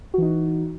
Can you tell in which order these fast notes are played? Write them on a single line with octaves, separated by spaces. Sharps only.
F#4 E3 D#4